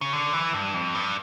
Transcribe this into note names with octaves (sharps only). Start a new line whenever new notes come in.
C#3
D3
E3
G2
F2
G2